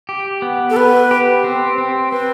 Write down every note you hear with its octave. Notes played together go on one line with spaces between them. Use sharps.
G4
B3
A4
B3 B4
G4
C4
C4
C4 B4